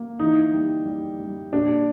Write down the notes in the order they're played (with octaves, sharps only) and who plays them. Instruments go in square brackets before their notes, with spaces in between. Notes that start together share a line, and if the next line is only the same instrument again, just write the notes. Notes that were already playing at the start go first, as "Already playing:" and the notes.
Already playing: [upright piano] A#3
E3 D#4
G3
G3
G3
A#2 D4